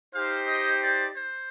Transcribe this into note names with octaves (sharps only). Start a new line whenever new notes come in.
D#4 G4 C5 F5 G5
D#5
D5
C5